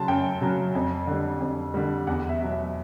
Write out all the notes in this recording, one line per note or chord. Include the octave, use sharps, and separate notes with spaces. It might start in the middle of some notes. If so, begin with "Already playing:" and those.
Already playing: C#3 F#3 A5 C6
F#2 G5
C#3 F#3
F2
D3 G3
F2
D3 G3
E2 F#5
E5
B2 F#3
E5